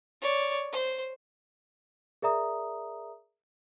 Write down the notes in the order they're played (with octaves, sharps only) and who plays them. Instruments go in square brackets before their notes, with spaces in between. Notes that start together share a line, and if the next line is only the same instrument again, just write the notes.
[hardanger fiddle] C#5 D5
C5
[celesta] G#4 A#4 D5 E5 A#5 D#6